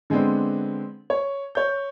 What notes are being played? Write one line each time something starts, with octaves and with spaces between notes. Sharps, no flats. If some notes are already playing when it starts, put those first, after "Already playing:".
D3 G#3 B3 C4 D4
C#5
C#5 G6